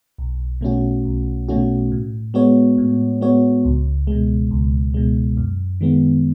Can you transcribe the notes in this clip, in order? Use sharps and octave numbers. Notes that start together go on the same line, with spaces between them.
B1
B2 A3 C#4 F#4
B1
B2 A3 C#4 F#4
A2
G#3 B3 F#4 C#5
A2
G#3 B3 F#4 C#5
C#2
B2 G#3
C#2
B2 G#3
F#2
D#3 G#3 B3